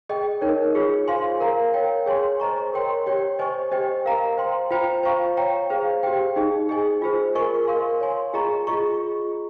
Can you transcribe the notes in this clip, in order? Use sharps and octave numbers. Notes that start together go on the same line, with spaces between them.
G#4 D#5 G5
D#4 A#4 C#5
F4 G#4 C#5
C5 F5 G#5 C6
A#4 F5 A#5
A#4 C#5 G5
G#4 C#5 G#5 C6
C5 D#5 A#5 C#6
A#4 C#5 G5 C6
G4 C#5 G5
C5 D#5 G#5 C#6
G4 C5 D#5 G5
A#4 F5 A#5
C5 G5 C6
F4 C5 G5 A#5
C5 F5 A#5 C#6
C#5 G5 A#5
G#4 C5 F5
G4 C5 G5
D#4 G#4 D#5
G#4 D#5 G#5
F4 G#4 C5
A#4 D#5 G#5 C#6
A#4 F5 C6
C#5 G#5 C6
F4 G#4 D#5 A#5 C#6
F4 G#4 D#5 A#5 C#6